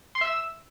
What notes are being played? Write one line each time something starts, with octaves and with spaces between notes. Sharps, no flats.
C6
E5
E6